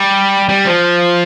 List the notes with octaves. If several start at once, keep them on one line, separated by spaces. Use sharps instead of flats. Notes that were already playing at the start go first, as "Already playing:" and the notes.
Already playing: G3
G3
F3